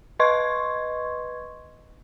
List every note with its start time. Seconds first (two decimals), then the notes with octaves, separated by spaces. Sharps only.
0.20 B4 D#5 C6 C#6 G#6